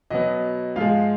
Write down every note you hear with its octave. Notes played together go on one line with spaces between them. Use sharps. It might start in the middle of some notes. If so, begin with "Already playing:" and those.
B2 F#3 B3 D#5
G#2 F3 G#3 F4 F5